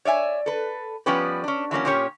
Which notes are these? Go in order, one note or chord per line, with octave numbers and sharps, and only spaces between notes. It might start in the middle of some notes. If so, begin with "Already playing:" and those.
C#5 D5 E5 G#5
A4 B4
F3 G3 B3 C#4 G4 B4
C#4 D4
E3 F#3 A#3 C#4
A#2 A#3 C#4 G4 C#5